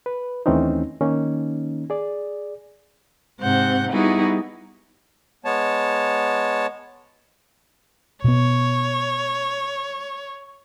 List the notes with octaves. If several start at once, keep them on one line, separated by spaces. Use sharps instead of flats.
B4
D#2 E3 A3 C4 C#4 D#4
D#3 A#3 C#4 D#4
G#4 D5
G#2 C3 C4 F#5 G6
G3 B3 D#4 E4 F#4 G#4
G#3 B3 C#5 A5
B2 B3 C#5